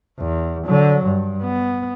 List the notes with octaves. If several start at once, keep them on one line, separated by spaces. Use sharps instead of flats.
E2
D3 F#3
G2
B3